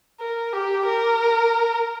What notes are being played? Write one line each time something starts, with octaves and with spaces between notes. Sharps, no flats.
A#4
G4
A#4